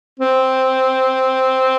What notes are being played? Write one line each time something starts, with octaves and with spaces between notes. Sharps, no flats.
C4